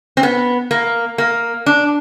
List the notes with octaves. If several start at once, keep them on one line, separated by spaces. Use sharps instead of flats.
C4
B3
A#3
A#3
D4